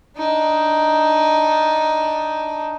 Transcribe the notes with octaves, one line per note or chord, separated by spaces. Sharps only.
D4 D#4